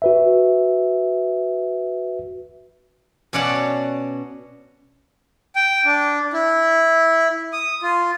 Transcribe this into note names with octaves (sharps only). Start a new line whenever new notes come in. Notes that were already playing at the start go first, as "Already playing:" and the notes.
F#4 B4 E5
B2 C#4 C#5 D5 F#5 A5
G5
D4
E4
D#6
F4